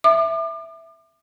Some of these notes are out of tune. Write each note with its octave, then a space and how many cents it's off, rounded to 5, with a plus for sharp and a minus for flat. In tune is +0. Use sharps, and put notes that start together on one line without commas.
E5 +0 D6 +40